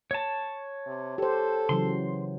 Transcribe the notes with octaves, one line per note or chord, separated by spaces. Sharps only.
C#5 A5
C3
G4 A4 C5
C#3 E3 F#3 C6